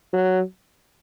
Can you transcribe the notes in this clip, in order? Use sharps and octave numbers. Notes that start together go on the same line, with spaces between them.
F#3